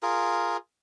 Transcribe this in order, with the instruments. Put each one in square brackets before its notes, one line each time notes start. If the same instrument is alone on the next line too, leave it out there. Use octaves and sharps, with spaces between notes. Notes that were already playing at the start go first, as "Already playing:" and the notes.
[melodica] F4 G#4 A#4